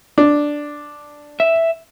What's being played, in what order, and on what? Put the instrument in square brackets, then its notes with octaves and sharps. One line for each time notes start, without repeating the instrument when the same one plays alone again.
[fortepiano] D4
[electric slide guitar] E5